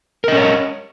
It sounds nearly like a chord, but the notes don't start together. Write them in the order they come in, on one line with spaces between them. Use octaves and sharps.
A#4 D#5 C#4 C#5